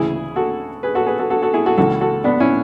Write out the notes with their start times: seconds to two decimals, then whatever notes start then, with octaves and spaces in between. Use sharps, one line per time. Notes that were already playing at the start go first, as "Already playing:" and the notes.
Already playing: D2 C#3 E3 E4 G#4
0.36 F#4 A4
0.83 G#4 B4
0.95 F#4 A4
1.06 G#4 B4
1.19 F#4 A4
1.30 F#4 A4
1.42 F#4 A4
1.54 E4 G#4
1.66 F#4 A4
1.77 C#2 C#3 E3 F#4 A4
2.01 F#4 A4
2.24 B3 D4
2.40 C#4 E4